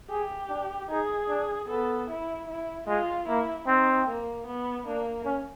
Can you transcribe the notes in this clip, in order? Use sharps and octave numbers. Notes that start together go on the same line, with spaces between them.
G4 G#4
D4
D#4 G#4
D4
B3 A4
E4
E4
G#3 F4
A#3 E4
C4 D#4
A#3
B3
A#3 D4
C#4